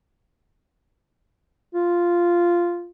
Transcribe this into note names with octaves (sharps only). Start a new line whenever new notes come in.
F4